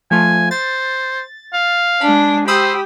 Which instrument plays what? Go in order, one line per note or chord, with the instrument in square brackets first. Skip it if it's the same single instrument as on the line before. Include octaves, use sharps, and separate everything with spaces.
[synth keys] F3 A3 F4 [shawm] G#5
[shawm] C5 [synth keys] A6
[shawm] F5
[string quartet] G#3 D4 [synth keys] B5
[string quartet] G4 [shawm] C5 [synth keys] B5 D#6 E6